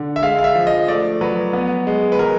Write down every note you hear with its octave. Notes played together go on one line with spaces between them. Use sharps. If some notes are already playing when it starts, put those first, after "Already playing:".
Already playing: D3
E5
G#3 F5
F5
E5
F3
D#5
A3 D5
F#3 B4
B3
G#3
B4
F#3 A#4